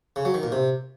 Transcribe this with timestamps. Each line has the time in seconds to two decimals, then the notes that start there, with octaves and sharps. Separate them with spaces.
0.16 C#3
0.25 F#3
0.34 D#3
0.43 A#2
0.52 C3